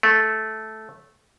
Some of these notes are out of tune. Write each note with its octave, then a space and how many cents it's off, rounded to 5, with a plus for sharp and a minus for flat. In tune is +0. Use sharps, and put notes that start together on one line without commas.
A3 -10